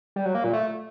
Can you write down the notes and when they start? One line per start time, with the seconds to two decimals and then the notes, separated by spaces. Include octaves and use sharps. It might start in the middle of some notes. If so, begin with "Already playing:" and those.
0.16 G3
0.25 F#3
0.35 A#3
0.44 A#2
0.53 A3